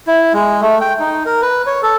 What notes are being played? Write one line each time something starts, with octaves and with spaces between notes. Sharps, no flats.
E4
G#3
A3
G5
D#4
A#4
B4
C#5
A4